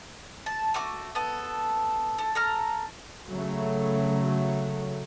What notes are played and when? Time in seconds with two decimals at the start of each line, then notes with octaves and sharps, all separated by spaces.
0.46 A5
0.74 A3 F#4 D6
1.15 B3 A4
2.18 A4
2.35 A4 A#5 F6
3.27 C#3 F#3 A3